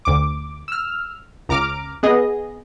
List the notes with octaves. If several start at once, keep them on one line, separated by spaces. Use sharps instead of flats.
D2 D6
E6 F6
C#2 A#5 D6 F6 D7
B3 G#4 D#5